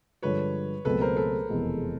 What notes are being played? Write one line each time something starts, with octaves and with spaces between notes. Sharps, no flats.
G2 D3 F3 G#3 B4 C#5
C#2 B2 F#3 A3 C4 A4 B4
A#4 C5
A4 B4
F1 E2 B2 G#3 B3